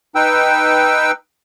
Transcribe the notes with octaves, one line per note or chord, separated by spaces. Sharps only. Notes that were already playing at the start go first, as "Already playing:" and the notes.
D#4 B4 G5 E6